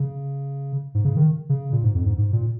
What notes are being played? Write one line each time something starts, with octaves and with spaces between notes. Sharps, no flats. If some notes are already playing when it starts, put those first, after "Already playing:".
Already playing: C#3
G#2
C#3
D#3
C#3
A#2
G#2
F2
G#2
G#2
A#2